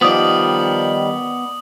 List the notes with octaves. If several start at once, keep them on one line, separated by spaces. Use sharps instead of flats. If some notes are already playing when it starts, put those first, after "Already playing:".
D#3 F3 G3 B3 D5 D#6 F#7